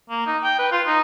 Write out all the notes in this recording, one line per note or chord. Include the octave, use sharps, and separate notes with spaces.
A#3
D#4
G5
B4
F4
D#4